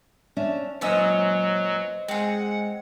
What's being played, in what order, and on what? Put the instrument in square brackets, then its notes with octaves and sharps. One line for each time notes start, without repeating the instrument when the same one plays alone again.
[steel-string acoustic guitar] C#4 D4 E5
[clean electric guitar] F#2 A#2 [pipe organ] F#3 [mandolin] B3 C#4 E6 [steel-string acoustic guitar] C5 D#5
[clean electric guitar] G#3 [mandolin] C4 G#4 [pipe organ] F#5